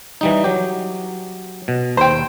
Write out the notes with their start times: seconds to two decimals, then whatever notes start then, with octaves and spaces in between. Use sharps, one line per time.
0.21 E3 G3 D#4
0.44 F#3 G4
1.68 B2
1.97 D#2 C5 G5